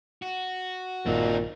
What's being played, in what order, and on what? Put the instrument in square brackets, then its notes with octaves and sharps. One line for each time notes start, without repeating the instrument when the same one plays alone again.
[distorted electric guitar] F#4
[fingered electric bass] A#1 G2 D#3 [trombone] A#2 [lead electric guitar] C4 D#4